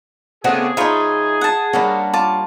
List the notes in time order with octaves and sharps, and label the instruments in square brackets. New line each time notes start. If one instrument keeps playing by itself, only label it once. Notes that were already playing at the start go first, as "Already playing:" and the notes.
[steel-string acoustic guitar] C#3 C4 [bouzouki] A3 B3 D4 [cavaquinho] F#4 [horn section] G#4
[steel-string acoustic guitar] F3 D#4 [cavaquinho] F4 C#5 B5 [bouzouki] E5
[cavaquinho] F#5 A5
[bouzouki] G3 A#3 F#4 [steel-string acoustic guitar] C#4 D4
[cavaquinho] F4 A5 D6